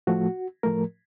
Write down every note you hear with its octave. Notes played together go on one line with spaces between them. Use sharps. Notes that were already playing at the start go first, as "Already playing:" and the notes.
A2 F3 A3 F#4
A2 F3 A3 A#4